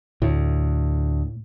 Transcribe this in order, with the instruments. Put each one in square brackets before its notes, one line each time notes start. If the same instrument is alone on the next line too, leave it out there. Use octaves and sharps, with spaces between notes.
[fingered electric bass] D2 [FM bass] A2